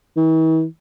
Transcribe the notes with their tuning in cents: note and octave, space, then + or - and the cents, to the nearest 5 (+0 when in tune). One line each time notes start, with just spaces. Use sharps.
E3 -45